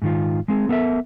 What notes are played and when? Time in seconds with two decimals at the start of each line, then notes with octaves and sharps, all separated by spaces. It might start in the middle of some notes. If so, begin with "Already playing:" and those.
0.02 G#2 D#3 F4
0.48 G#3 C4 G#4
0.69 B3 A4 A#4 E5